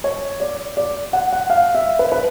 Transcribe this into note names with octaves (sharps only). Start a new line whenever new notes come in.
C#5
D5
D5
F#5
F#5
F5
E5
B4
B4